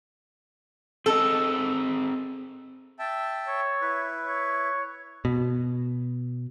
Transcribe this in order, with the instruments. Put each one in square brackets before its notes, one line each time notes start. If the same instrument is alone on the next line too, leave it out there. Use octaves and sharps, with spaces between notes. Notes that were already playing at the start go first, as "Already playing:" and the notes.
[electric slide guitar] C4 G#4 D#5 [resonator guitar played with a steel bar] A4
[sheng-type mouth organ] E5 G5 A5
[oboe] C#5
[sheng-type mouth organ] E4 B4
[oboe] C#5
[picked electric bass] B2